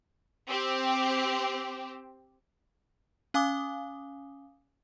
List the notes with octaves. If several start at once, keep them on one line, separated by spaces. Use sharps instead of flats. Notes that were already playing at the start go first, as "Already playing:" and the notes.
C4 G4
C#4 F5 G#5 D6 D#6 G7